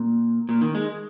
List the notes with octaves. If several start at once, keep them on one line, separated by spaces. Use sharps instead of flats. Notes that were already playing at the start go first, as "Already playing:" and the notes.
Already playing: A#2
A#2
D#3
G#3